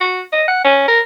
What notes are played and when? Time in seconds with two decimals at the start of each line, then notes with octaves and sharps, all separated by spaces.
0.01 F#4
0.33 D#5
0.48 F#5
0.65 C#4
0.88 A#4